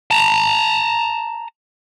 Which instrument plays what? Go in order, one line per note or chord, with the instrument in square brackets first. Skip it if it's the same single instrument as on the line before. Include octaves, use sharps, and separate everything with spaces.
[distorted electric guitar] A5 A#5